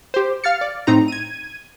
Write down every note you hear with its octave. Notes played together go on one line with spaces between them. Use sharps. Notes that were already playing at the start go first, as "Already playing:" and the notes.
G4 C5
F5 F6 A6 C#7
D5
A2 C4 D#4 A#5
G#6 D#7